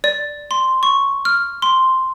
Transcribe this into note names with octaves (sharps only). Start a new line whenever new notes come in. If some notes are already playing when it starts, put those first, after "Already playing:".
D5
C6
C#6
F6
C6